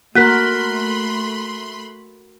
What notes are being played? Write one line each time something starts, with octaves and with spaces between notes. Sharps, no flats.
A3 A#3 F#4 A#4 B5 C6 F#6 B6